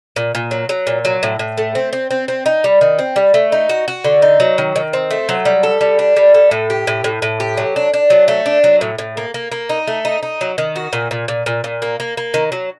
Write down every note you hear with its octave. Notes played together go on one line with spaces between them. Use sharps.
A#2
A#2
F#3
F#3
A#2
F#3
A2
A2
A3
C4
C4
C4
C4
D#4
G3
D#3
C4
G3
A3
D#4
F#4
F#4
D3
D#4
F#3
D#3
D#3
C4
A3
F#3
G3
A4
G3
D4
G3
A4
A2
G4
A2
A2
A2
G4
F#3
D4
D4
F#3
A3
D4
F#3
A2
A2
A#3
A#3
A#3
D#4
A3
D#4
D#4
F#3
D#3
F#4
A#2
A#2
A#2
A#2
A#2
A#3
A#3
A#3
D#3
F#3